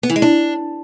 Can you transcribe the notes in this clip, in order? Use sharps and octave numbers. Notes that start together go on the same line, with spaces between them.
B3
E3
G#3
D4